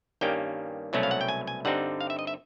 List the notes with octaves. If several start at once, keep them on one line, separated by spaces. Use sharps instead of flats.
G2 D#3 G3 A#3 C#4 G5
C2 B2 F#3 A3 C#4
F5
F#5
G5
G#5
G#5
G2 D3 G3 C4 D#4 F#5
F5
E5
D#5
E5